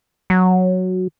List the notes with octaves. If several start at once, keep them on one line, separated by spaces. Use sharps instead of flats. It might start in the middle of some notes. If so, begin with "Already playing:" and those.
F#3